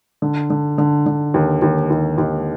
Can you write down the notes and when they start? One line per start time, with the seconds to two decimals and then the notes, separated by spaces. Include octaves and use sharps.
0.22 D3
0.50 D3
0.78 D3
1.06 D3
1.34 D#2
1.62 D#2
1.90 D#2
2.18 D#2